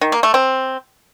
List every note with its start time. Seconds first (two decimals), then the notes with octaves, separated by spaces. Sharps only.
0.01 D#3
0.12 A#3
0.23 A3
0.34 C4